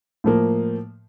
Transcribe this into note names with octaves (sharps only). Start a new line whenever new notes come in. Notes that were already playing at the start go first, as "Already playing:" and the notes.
A2 F3 A#3